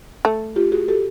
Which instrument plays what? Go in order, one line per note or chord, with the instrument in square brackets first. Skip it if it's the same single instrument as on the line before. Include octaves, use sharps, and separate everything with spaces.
[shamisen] A3
[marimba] F4 G4
F#4 G#4
G4 A4